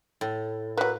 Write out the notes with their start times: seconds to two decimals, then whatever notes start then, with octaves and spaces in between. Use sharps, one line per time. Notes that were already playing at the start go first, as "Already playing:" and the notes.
0.21 A2
0.78 F#3 A#3 B4